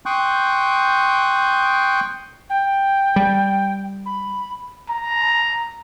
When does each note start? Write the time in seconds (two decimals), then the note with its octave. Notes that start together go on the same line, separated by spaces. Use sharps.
0.06 G5 C6 C#6 D#6 F#6 G6
2.49 G5
3.16 G3
4.05 B5
4.90 A#5